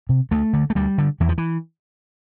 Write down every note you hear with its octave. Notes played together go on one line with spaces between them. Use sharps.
C3
D2 A3
D3
A3
D2 G3
D3
E2 E3
F3
E3